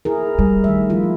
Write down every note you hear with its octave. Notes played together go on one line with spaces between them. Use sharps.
E4 G#4 A#4
G3
D#3 A3 E5
F3 E4 F4